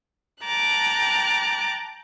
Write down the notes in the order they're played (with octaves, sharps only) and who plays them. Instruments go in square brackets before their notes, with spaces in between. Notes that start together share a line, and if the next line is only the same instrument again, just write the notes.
[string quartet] G5 A5 A#5 D6 F#6